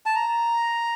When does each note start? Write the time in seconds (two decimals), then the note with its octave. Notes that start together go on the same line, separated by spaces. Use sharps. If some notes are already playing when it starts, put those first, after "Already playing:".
0.06 A5
0.15 A#5